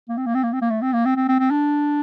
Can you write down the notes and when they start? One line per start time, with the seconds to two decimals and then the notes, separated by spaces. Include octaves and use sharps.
0.09 A#3
0.17 C4
0.26 A#3
0.35 C4
0.43 A#3
0.53 C4
0.62 A#3
0.70 A3
0.82 C4
0.93 A#3
1.05 C4
1.17 C4
1.28 C4
1.39 C4
1.51 D4